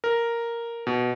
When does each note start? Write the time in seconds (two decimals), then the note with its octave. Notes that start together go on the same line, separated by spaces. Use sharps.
0.04 A#4
0.87 B2